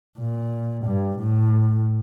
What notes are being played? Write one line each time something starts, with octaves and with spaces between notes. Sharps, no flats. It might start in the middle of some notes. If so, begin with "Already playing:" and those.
A#2
G2
A2